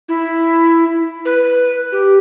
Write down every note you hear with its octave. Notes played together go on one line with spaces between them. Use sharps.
E4
B4
G4